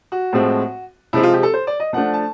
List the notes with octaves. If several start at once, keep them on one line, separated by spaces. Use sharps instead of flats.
F#4
A2 F3 G#3 C4
C3 F3 G#3 C4 E4
F4
G4
A4
C5
D5
D#5
F3 A3 D4 F#5
A5